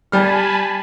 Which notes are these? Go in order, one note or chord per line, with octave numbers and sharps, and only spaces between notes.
G3 G#5 A5 B5 F6